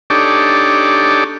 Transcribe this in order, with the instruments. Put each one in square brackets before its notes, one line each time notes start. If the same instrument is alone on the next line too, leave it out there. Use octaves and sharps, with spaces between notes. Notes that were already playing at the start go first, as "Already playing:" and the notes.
[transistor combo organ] D4 D#4 G4 A4 C#5 D5